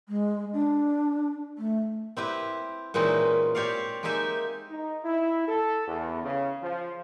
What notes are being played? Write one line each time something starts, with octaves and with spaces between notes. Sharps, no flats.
G#3
D4
A3
C4 E4 G4 B4
A#2 E3 G#3 C4 C#4 D#4
C4 G4 C#5 D5 F5
G#3 A#3 D#4 G4 E5 G#5
D#4
E4
A4
E2
C#3
F3